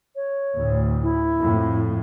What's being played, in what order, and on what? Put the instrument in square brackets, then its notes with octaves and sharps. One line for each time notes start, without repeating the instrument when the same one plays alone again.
[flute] C#5
[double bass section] D2 A2
[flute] E4
[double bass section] F2 A2